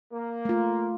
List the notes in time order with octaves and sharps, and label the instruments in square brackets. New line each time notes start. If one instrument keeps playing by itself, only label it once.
[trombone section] A#3
[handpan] A3 F4